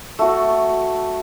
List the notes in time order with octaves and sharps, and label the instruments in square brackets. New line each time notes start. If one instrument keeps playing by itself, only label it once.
[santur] A3 F#4